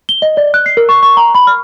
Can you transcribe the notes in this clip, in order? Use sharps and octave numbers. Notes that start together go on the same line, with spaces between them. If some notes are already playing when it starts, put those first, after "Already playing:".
G7
D#5
D5
F#6
C7
A#4
C#6
C#6
A#5
B5
F6